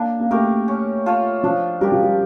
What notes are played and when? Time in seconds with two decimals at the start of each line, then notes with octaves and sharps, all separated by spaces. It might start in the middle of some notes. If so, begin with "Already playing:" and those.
Already playing: A#3 D4
0.20 A#3
0.31 A3 G4 A#4
0.68 C#4
1.06 F4 A4 C#5
1.44 F3 D4
1.81 G3 G4 A#4
1.92 F3
2.03 G3